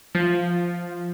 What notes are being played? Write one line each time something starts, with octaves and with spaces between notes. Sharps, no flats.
F3